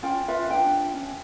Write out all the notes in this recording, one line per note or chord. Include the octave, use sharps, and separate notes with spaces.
C#4 F4 G5
F4 B4 E5
D4 G5
C#4